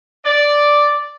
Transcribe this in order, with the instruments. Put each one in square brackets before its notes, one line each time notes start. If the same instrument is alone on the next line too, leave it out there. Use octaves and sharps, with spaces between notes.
[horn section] D5